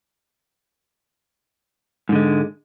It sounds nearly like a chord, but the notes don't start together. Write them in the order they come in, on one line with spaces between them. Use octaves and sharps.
G#2 D3 G#3